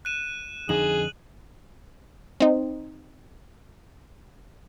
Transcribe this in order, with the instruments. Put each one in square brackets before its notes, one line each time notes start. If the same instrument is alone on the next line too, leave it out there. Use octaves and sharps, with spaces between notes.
[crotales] F#6 D#7 E7
[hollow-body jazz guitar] F2 D3 D#4 [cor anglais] G#4 [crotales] F#7
[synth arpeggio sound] C4 D#4